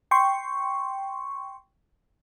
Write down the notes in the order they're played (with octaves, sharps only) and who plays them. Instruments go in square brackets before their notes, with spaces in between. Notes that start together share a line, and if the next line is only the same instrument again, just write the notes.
[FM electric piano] G5 C6 C#6